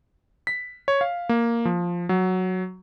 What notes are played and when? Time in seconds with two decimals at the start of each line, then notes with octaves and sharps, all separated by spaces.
0.47 B6
0.88 C#5
1.01 F5
1.29 A#3
1.65 F3
2.09 F#3